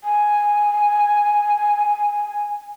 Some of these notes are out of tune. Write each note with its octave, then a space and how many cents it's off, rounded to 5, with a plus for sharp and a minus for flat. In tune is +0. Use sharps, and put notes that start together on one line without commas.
G#5 +0